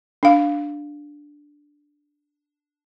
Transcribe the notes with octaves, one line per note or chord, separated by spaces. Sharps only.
D4 F5